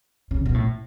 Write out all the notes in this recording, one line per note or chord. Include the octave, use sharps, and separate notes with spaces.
C#3
B2
A2